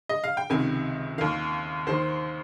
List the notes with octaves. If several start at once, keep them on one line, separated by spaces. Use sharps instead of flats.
D#5
F5
G5
C#2 C3 D#3 G#5
D#2 D#3 F5
D#2 D#3 C5